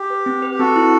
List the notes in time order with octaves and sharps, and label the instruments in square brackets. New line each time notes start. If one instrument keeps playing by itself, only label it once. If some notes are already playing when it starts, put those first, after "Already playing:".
Already playing: [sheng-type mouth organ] G4
[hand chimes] B4
C4
B4
[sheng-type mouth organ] G4
[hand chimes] C4 [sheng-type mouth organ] F#4 A4
[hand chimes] E4